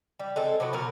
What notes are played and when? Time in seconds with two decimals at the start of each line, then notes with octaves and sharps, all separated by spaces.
0.20 G3
0.36 G#3 C4 A4
0.60 C3 F#3 B3 F#4
0.73 B2 F#3 A#4